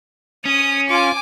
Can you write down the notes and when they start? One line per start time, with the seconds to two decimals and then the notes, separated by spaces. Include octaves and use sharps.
0.45 C#4 D#6
0.90 F4 G#5 D6